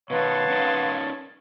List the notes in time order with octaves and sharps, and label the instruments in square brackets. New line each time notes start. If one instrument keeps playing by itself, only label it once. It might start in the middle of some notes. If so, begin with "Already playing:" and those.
[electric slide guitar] B2 D#3 [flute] B4 [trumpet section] C#5 A5 [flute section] F5 F#5 C6
[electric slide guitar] C#4 D#4 A#4